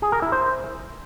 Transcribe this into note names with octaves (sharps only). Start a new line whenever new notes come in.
G#4
A#4
E4
C5